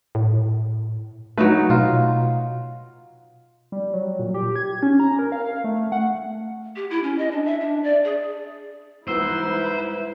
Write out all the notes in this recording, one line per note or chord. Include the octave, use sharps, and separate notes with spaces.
A2
F#3 A3 D#4 B4
B2 F4
G3
F#3
A#2
G4
G#6
C#4
A#5
A#4
F5
F5
A3
F#5
G4
E4
C#4
D#5
D4
E5
D4
D5
G#4
C2 G#2 E3 E4 B4 C5 E6